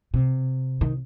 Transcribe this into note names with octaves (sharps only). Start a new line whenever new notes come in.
C3
D#3